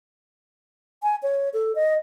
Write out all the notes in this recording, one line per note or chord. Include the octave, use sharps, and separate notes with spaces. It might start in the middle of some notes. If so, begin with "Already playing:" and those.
G#5
C#5
A4
D#5